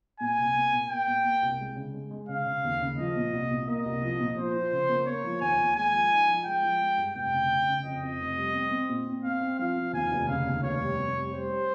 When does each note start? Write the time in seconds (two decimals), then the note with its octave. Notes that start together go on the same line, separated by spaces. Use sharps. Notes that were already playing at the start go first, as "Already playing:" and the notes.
0.20 A#2 G#5
0.37 C2
0.54 A#3
0.72 A#2
0.89 A#3 G5
1.07 A#2
1.24 A#3
1.42 C2
1.59 G#3
1.76 C#3
1.93 G#3
2.10 G#3
2.28 C#3 F5
2.46 C#3
2.64 D#2
2.81 C#3
2.98 F3 D#5
3.16 A#2
3.33 C2
3.51 A#2
3.67 A#3 D#5
3.85 C2
4.02 F3
4.20 A#2
4.37 F3 C5
4.54 F3
4.72 C#3
4.89 A#3
5.06 A#3 C#5
5.24 F3
5.41 D#2 G#5
5.59 D#2
5.76 G#3 G#5
5.93 F3
6.10 D#4
6.28 F3
6.45 G#3 G5
6.63 F3
6.81 G#3
6.97 G2
7.15 F1 G5
7.33 C#3
7.50 C#3
7.67 C#3
7.84 F2 D#5
8.03 F2
8.19 F1
8.37 G3
8.54 C4
8.71 C4
8.89 A#2
9.07 C4
9.24 C4 F5
9.41 C4
9.58 F3 F5
9.76 F3
9.93 D#2 G#5
10.11 F1
10.28 C#3 F5
10.46 D#2
10.63 F1 C#5
10.80 G3
10.98 F1
11.16 G3
11.32 G3 C5
11.49 G3